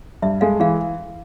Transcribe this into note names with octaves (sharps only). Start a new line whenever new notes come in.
G2 E5
G#3 F5
E3 F5